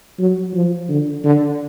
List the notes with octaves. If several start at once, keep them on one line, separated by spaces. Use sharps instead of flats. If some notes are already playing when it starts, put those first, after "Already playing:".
F#3
F3
D3
D3